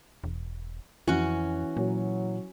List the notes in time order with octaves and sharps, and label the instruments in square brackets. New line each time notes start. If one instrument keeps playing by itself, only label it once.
[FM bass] E1
[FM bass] F2 [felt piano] E3 [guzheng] C#4 F#4
[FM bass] A#2 [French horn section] F#3